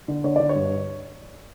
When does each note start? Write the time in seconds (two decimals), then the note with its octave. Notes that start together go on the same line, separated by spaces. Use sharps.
0.08 D3
0.24 D3 C#5
0.36 D3 D5
0.49 C#5
0.55 G2